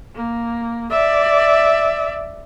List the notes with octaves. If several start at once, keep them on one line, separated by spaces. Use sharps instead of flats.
A#3
D5 E5